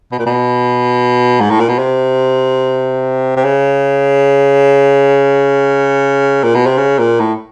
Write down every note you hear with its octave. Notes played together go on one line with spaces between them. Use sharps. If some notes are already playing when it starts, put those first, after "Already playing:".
B2
A#2
B2
G#2
A2
A#2
B2
C3
C3
C#3
A#2
B2
C3
C#3
A#2
A2